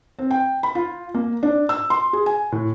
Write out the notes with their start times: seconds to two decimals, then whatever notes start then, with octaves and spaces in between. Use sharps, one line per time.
0.19 C4
0.31 G5
0.63 B5
0.75 F4
1.14 A#3
1.43 D4
1.69 E6
1.90 C6
2.13 G#4
2.26 G#5
2.52 A2